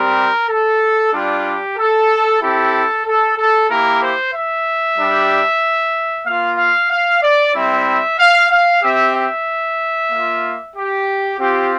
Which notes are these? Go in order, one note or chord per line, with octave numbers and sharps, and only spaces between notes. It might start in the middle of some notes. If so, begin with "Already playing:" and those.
Already playing: G3 C4 G4 A#4
A4
G3 D4 F4 G4
A4
C4 E4 G4 A4
A4
A4
A#3 E4 G4 A#4
C5
E5
G3 D4 G4
A#3 F4 F5
F5
F5
D5
G3 C4 E4 E5
F5
F5
C4 G4 E5
E5
A#3 F4
G4
C4 F4 G4